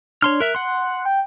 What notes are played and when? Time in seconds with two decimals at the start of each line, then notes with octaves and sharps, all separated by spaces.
0.22 D4 C#5 C6 F6
0.40 A#4 E5 F#6
0.55 F#5 C6
1.05 G5